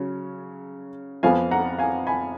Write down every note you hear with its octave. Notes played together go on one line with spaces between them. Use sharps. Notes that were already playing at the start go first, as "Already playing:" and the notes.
Already playing: C#3 F#3 C#4
F2 F3 B3 F5 G#5
F#5 A#5
F5 G#5
G#5 B5